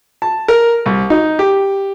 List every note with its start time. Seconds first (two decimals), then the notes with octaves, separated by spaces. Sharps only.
0.22 A5
0.48 A#4
0.86 C2
1.10 D#4
1.39 G4